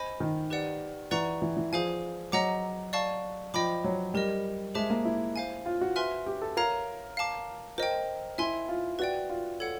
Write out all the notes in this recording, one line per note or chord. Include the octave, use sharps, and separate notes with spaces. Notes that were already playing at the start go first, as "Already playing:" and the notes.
Already playing: C5 D#5 G#5 B5
D#3
G4 B4 D5 F#5
E3 B4 D5 F#5 A#5 C#6
E3
E3
F3 G#4 C5 F5 G#5
F#3 D#5 F#5 A#5 D6
D5 F5 A5 C#6
F3 C5 D#5 G5 B5 D6
F#3
G3 G4 A#4 D#5
G#3 G#4 C5 E5 A5 D6
A#3
E4
C5 F5 G#5
F4
F#4
B4 E5 G#5 C6 F6
G4
A4
A#4 C#5 F5 A#5
F5 A5 D6
A#4 C5 D#5 G5
E4 E5 G#5 C6
F4
F#4 B4 D5 G5
F4
A4 C#5 F#5